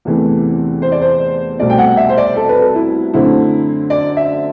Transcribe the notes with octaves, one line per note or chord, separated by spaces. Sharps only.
E2 C3 E3 A3
C5
D5
C5
C2 B2 A3 C4 D5
G5
F#5
E5
C5
D5
A4
B4
A4
E4
F#2 D3 A3 C4 E4
D5
E5